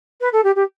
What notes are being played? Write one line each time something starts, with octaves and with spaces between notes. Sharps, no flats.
B4
A4
G4
G4